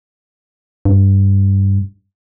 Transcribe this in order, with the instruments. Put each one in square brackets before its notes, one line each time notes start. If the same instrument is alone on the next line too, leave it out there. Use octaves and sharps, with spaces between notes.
[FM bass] G2